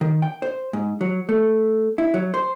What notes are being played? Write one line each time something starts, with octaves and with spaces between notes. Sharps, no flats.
D#3
G5
C5
G#2
F#3
A3
E4
F#3
C5